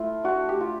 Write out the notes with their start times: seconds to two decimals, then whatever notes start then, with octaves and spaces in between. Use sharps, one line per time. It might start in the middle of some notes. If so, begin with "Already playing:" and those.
Already playing: A3 E4 F4
0.24 D4 F#4
0.49 G4
0.61 F4